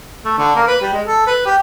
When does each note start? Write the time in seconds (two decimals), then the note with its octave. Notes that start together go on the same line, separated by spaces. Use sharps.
0.25 A3
0.38 D3
0.56 A#3
0.67 B4
0.81 G3
0.93 G#3
1.06 A4
1.27 B4
1.45 G4